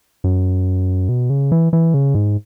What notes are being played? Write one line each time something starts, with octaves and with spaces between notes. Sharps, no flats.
F#2
B2
C#3
E3
E3
C#3
G#2